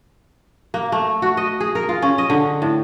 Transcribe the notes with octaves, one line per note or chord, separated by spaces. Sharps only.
A#3
A3
F#4
D#5
G#4
A#4
F4
C#4
D#5
D3
A2